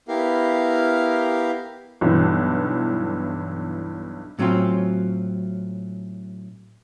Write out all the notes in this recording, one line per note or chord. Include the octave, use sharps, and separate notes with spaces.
B3 E4 G4 A#4 F5
B1 G2 E3
A2 F#3 C4 C#4 F4